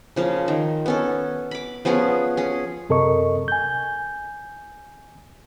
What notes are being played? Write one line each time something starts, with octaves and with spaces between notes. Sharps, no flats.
C#3 F3 A#3
D#3
B3 C#4 A4
B5 D6
F3 B3 C#4 G#4
C#4 G#4
F#2 C3 A4 A#4 D#5 C#6
G#5 G6